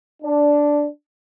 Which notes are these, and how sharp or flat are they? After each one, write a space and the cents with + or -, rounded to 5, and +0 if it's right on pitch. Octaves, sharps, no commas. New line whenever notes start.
D4 -5